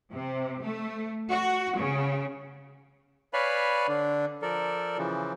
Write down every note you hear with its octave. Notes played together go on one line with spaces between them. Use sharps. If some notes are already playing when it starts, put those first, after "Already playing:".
C3
A3
F#4
C#3
B4 C#5 D5 F5 G#5 B5
D3 D4
F3 A4 A#4 D5
C#3 E3 F3